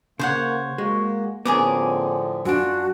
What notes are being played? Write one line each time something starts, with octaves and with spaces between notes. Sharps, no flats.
C#3 A#3 C5 C#5 F#5
G#3 A#3 F#4
A2 D3 F3 B3 C#4 G#4 A#4 D6
F#2 D4 F4 F#4